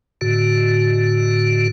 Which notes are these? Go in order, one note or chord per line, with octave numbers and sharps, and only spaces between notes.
A2 D3 F#4